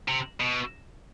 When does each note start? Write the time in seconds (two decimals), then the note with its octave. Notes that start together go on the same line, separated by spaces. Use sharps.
0.08 C3
0.40 B2